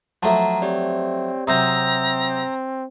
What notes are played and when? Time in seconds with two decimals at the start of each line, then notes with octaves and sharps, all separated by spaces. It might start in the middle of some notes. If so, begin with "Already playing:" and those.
0.23 F3 F#3 A3 F#5 A5 A#5
0.62 C4 G4 C#5 D5
1.47 C3 F#3 C4 A#5 D#6 E6 G6